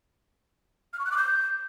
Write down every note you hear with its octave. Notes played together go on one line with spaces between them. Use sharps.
F6
C#6
F#6
D6
G6